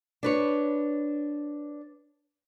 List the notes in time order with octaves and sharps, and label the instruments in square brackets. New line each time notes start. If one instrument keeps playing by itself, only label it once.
[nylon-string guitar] D4 B4 C#5